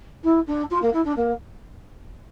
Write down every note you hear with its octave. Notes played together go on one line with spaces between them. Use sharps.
E4
D4
F4
A#3
E4
D4
A#3